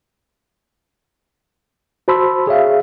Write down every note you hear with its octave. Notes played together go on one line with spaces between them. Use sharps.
F#4 C5 A5 B5 C6 E6
G#4 C#5 E5 F5